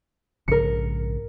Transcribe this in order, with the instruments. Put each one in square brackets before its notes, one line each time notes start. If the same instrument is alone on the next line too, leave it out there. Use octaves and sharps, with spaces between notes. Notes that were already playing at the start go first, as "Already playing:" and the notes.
[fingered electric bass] A#1 G#2 C#3 [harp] A#4 C#7